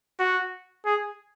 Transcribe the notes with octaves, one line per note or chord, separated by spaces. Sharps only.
F#4
G#4